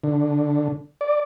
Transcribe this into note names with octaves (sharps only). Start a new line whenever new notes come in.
D3
D5